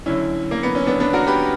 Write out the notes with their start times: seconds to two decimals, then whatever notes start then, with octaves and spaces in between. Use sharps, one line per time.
0.06 F#2 D3 F#3 C#4 E4
0.51 A#3
0.63 B3
0.75 C#4
0.87 B3 D4
1.00 B3 D4
1.13 F#4 A#4
1.27 G4 B4